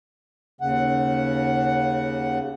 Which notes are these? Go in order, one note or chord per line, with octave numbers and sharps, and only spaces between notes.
D#2 C#3 F#5